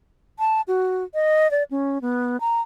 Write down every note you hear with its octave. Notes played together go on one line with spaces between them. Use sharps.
A5
F#4
D#5
D5
C#4
B3
A#5